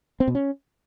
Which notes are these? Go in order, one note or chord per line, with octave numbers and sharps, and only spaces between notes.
C4
B2
C#4